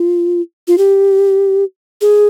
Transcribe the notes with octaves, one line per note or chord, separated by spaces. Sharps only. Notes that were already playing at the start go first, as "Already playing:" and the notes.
Already playing: F4
F4
G4
G#4